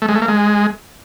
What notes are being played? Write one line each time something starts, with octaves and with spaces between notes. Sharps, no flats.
A3
G#3
A3
A#3
G#3